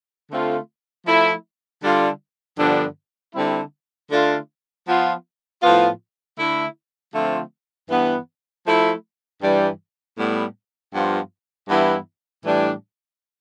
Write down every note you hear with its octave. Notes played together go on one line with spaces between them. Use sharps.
D3 A3 C4 F4
F3 A3 E4
D3 G3 D4 F4
G2 D3 F3 B3 D4
D3 G3 C4 E4
D3 A3 D4 F4
F3 B3 F4
A2 F3 B3 F4
D3 A3 E4
D3 F3 A3 C4 F4
G2 E3 B3
F3 A3 E4
G2 E3 G3
A2 G3 B3
G2 F3 B3 F4
G2 E3 B3 E4
A2 E3 G3 D4